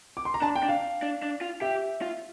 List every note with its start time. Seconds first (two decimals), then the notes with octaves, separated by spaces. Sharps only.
0.17 D6
0.25 C6
0.34 A#5
0.42 D4 A5
0.56 G5
0.63 D4
0.69 F5
1.03 D4
1.22 D4
1.41 F4
1.62 G4 E5
2.02 F4